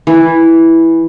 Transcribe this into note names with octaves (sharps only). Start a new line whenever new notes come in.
E3